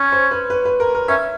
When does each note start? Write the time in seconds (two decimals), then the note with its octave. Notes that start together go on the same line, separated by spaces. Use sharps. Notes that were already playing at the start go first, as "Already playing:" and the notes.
Already playing: C#4 C#5
0.12 C5
0.31 B4
0.50 B4
0.65 B4
0.80 A#4
0.95 A#4
1.08 C#4 E5